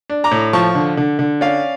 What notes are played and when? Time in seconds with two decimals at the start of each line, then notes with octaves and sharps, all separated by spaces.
0.10 D4
0.24 A#5 D6
0.31 A2
0.53 F3 A5 C#6
0.75 D3
0.97 D3
1.19 D3
1.41 C#4 D5 F5